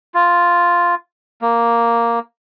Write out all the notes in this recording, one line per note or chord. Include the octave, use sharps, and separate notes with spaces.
F4
A#3